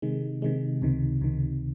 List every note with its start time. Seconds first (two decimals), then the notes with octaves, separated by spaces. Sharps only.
0.02 C3 D#3 G#3
0.42 C3 D#3 G#3
0.82 C#2 C3 D#3
1.21 C#2 C3 D#3